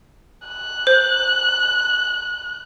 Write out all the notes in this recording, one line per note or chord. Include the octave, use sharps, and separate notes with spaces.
F#6
C5